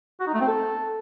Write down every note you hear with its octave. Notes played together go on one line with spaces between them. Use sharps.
F#4
D#4
A3
C4
A4